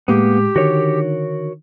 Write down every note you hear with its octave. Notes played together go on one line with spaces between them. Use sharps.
A2 G#3 A#3 B3 G4
D3 D#3 F#4 A#4 C#5